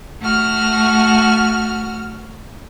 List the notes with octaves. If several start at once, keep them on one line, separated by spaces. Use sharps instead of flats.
A3 F#4 F6